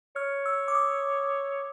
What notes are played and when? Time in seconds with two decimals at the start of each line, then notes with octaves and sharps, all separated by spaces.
0.16 C#5 F6
0.46 E6
0.68 D6
0.75 D#6